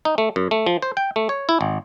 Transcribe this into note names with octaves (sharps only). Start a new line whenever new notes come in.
D#4
A3
F#2
A3
F3
C5
G5
A3
C#5
E4
G#1